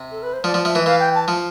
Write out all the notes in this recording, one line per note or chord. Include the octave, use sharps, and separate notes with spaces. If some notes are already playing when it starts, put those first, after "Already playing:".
Already playing: C3
A4
B4
C5
F3 D5
F3
F3 E5
E3
E3 F5
G5
A5
F3